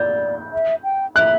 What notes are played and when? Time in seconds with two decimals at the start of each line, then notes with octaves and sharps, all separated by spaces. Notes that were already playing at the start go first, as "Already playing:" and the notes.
Already playing: D5 G6
0.53 E5
0.84 G5
1.16 E5 F#6